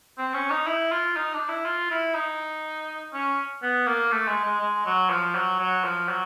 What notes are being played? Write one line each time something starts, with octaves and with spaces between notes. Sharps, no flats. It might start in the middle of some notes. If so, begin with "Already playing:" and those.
C4
C#4
D#4
E4
F4
D#4
D4
E4
F4
E4
D#4
C#4
B3
A#3
A3
G#3
G#3
G#3
F#3
F3
F#3
F#3
F3
F#3